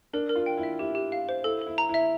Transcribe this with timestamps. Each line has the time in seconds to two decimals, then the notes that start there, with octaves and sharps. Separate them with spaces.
0.13 D4 A#4
0.29 A#4
0.35 F4
0.46 G5
0.57 E4
0.63 E5
0.79 E4 G4
0.95 G4
1.12 F5
1.29 C5
1.44 E4 A4
1.62 E4 A4
1.78 A#5
1.89 E4
1.94 E5